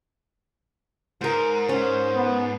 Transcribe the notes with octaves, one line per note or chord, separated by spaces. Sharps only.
G#2 A#4 C5
C#4 C5
B3